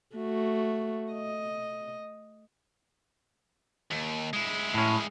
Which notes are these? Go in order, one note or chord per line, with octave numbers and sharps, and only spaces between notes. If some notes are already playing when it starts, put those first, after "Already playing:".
A3 F#4
D#5
D#2
G#3 E4
A2 C#4